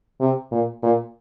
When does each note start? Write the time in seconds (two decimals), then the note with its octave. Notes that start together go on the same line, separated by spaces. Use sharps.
0.20 C3
0.52 A#2
0.83 A#2